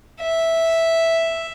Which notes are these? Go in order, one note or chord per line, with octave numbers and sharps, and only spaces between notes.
E5